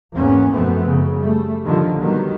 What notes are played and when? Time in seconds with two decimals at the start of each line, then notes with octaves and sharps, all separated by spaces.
0.14 G#1 E2 G#2 A#3 B3 C#4
0.52 F#2 B2 F3 A3 B3 C4
0.86 F#2 C#3
1.17 G3 A3
1.64 D3 D#3 F3 G3 A#3
1.98 D#3 F#3 G3 B3